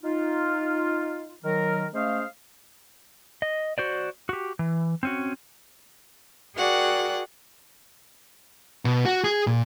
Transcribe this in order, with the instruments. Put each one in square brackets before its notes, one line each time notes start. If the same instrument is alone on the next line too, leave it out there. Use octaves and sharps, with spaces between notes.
[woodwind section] D#4 F4
D#3 F#3 A#4
G#3 A3 C#4 C5 D#5 F5
[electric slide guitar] D#5
F#4 C5 D5
F#4 G4
E3
C4 C#4 F#4
[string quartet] F#4 G#4 A#4 D5 F#5 G5
[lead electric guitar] B2
F#4
G#4
A#2